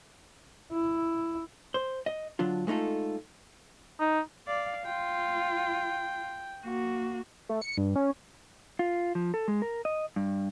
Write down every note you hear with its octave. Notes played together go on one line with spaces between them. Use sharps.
E4
C5
D#5
D3 F#3 D4 F4
G#3 A3 D#4 F4 A4
D#4
D5 F5
F4 G5
A#3 F#4
A3
C#7
G2
C#4
F4
F3
A4
G#3
A#4
D#5
G2